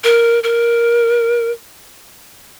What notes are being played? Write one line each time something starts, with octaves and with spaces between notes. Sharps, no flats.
A#4
A#4